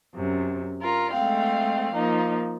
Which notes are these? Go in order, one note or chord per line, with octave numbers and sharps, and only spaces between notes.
F#2 C3
F4 A#4
G#3 A3 C4 F5
F3 A#3 D#4